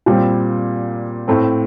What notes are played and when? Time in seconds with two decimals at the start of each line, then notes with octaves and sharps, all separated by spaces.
0.06 A#2 G3 C4
1.28 A2 A3 C4